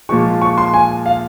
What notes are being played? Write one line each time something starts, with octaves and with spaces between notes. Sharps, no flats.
A#2 F3 G#3 C#6
C#6
C6
G#5
F5